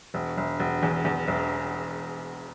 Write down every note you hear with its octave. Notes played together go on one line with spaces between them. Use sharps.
E1
E1
E1
E2
E2
E1